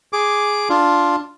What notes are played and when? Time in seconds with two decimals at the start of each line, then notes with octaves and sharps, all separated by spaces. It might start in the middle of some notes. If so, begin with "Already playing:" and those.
0.13 G#4 D6
0.69 D4 F4